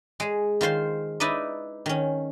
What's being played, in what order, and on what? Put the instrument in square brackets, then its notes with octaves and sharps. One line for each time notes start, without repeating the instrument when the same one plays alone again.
[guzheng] G#3 G#4
D#3 F4 C5 C6
D#4 E4 B4 D5 D#5
D#3 C#4